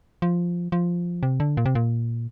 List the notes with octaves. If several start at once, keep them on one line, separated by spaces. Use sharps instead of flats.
F3
F3
C3
D3
A#2
C3
A#2